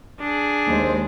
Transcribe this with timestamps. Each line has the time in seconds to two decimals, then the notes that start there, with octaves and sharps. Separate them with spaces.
0.20 D4 G#4
0.67 D#2 G#3 C5